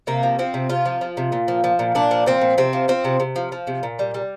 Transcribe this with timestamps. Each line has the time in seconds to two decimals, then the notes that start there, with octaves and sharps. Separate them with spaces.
0.07 C3 A#3
0.23 F3
0.39 F3 C4
0.54 C3
0.69 C3 F4
0.86 F3
1.01 F3
1.17 C3
1.32 A#2
1.48 F3
1.64 F3
1.79 A#2
1.95 A#2 D4
2.11 F3
2.26 F3 C4
2.41 A#2
2.58 C3 C4
2.73 F3
2.88 F3 C4
3.05 C3
3.20 C3
3.36 F3
3.52 F3
3.67 C3
3.83 A#2
3.99 G3
4.14 G3